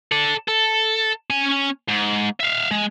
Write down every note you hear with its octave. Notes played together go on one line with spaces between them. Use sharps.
A4 D5
A4
C#4 G#5
G#2
E5 F5
G#3